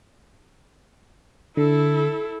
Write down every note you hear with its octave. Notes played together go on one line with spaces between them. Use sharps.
D3 E4 A4